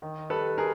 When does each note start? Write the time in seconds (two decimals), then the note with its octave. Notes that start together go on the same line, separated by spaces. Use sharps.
0.02 D#3
0.30 G3 A4 B4
0.58 G#4 A#4